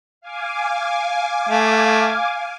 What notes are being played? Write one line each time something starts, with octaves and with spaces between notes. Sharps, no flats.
F5 G#5 D6
A3